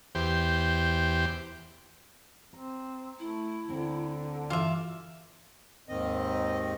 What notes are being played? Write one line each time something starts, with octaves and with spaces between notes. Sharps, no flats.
E2 G4 C5
C4 A#5
A3 E4
D2 D3 C4 A#5
G2 E3 F4 F#4 E5 D6
D#2 G#2 D#3 C4 D#5